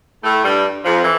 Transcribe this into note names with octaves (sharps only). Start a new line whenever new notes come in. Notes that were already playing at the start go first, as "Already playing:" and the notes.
A2 A3
G2 G3
F2 F3
E3